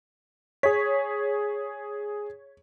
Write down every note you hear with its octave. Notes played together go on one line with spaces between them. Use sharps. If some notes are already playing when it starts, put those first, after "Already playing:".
G#4 C#5 B6